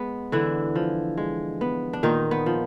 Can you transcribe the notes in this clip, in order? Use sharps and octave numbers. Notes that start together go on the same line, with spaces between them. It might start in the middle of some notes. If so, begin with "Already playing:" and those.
Already playing: G#3 B3
D3 E3 E4
F3
G#3
B3
D4
A#2 D#3 D#4
B3
F3